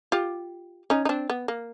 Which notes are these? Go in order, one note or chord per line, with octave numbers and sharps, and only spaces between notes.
F4 G4
C#4 D#4
D#4
C4 D4
B3
A#3